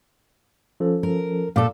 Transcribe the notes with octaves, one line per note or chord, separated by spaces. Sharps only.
F3 C#4 A4
A#4
A#2 A4 F5 D6